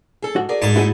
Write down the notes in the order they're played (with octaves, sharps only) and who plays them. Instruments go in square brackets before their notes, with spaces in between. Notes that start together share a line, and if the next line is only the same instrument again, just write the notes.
[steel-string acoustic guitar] G#4 A4
[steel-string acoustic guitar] G#2 [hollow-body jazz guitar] F#4
[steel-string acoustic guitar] G#4 A#4 D5
[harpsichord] G#2 A5
[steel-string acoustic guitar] A3 C4 A4 [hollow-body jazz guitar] E4 F#4 G#4